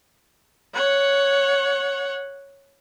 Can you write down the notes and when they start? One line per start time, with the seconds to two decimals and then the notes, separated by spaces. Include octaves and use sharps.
0.75 C#5 F#5